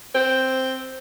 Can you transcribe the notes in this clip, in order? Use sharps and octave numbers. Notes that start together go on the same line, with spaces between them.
C4